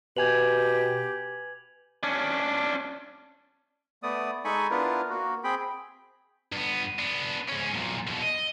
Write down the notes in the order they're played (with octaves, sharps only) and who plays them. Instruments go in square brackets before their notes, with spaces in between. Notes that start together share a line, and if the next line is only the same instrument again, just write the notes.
[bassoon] B2 [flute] G4 [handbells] B4 G#5 [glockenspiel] G#6 F7 F#7
[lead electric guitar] C#4 D4
[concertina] A3 B3 D5 D#6
G#3 D#4 A4 G#5 B5 C#6
B3 D4 E4 F4 A#4 B4
A#3 F#4
C4 G#4 G5 B5
[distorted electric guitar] G2 B3
B3 D4
G#2 C#4
B1 A#2
E2 B2
D#5